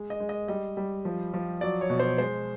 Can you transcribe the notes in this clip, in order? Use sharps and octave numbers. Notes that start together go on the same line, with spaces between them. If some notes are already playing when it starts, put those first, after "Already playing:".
Already playing: G#3
D#5
G#3
D#5
G3 D#5
G3
F3
F3
F#3 D5
C#5
B2
C5
G#3 C5